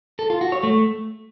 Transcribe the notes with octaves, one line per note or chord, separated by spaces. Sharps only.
A4
F4
F#4
C#5
A3